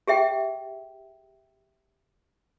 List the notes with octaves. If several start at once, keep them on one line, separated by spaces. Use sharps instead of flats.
G4 G#4 E5 G5